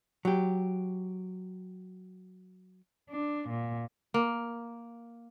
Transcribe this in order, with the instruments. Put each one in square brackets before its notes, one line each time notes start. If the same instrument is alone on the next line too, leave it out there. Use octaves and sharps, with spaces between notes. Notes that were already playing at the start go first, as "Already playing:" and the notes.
[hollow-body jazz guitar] F#3 G4
[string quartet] D4
A#2
[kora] A#3